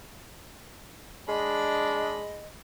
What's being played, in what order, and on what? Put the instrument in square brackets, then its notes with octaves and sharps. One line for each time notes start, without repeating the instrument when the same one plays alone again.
[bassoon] G#3 [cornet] D4 [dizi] D#5 [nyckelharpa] B5